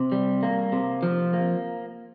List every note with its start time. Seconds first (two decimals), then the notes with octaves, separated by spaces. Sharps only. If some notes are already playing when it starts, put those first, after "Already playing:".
Already playing: C3
0.12 G3
0.43 A#3
0.72 C3
1.03 F3
1.33 A#3